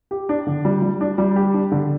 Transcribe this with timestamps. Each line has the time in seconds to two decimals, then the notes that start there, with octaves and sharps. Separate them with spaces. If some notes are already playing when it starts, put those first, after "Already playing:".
0.11 G4
0.29 D4
0.47 D3
0.65 G3
0.82 G3
1.01 D4
1.18 G3
1.36 G4
1.54 D4
1.72 D3